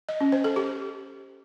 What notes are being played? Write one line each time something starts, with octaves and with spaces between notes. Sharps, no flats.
D#5
C#4
C5
A4
G4